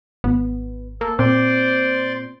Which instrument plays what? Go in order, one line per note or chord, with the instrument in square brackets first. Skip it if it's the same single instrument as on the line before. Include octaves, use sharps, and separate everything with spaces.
[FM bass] G#1 [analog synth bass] B3
[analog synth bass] A#3 [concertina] A4
[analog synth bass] A#2 [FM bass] C4 [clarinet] C5 [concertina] D5 C6 D6